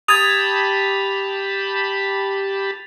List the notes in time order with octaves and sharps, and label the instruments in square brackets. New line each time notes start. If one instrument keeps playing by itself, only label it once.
[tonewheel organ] G4 A5 B5 [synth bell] D#6 G#6 [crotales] A6 D#7 F7